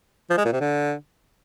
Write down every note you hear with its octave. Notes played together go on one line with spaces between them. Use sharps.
F3
G#3
A#2
C3
D3